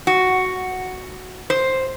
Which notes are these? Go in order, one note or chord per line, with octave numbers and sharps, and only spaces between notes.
F#4
C5